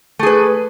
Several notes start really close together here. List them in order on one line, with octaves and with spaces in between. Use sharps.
A3 G#4 B4